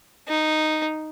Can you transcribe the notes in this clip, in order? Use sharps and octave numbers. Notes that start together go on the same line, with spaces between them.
D#4